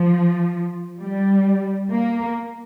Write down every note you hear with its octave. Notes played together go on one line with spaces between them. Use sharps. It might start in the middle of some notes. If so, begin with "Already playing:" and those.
Already playing: F3
G3
A#3